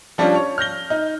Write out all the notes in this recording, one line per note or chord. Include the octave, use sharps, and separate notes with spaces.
F3 G3 C#4 D4 F4
C#5
F6 G6 A#6 G7
D#4